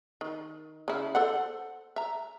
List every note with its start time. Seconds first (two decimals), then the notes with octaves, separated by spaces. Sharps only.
0.21 D#3
0.88 C#3 E4
1.15 A4 C5 F#5
1.96 E5 A#5